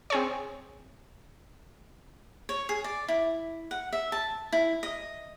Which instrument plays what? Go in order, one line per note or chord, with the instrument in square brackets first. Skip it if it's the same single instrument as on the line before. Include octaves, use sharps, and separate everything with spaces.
[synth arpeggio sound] C4 G#4 C#5
[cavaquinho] C#5
G#4
D5
E4
F#5
E5
A5
E4
D#5